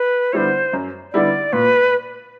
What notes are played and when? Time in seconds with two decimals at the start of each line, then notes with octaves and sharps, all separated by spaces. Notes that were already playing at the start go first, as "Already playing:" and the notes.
Already playing: B4
0.33 D3 G3 B3 E4 C5 C#5
0.73 F#2
1.13 D3 G3 B3 E4 D5
1.53 A#2 B4